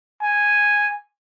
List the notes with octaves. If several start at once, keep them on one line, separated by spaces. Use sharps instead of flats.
G#5